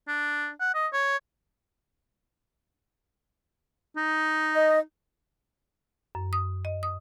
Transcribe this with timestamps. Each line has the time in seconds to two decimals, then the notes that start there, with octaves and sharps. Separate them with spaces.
0.08 D4
0.60 F#5
0.75 D#5
0.93 C#5
3.97 D#4
4.55 D#5
6.15 F#2
6.33 D#6
6.65 D#5
6.83 D#6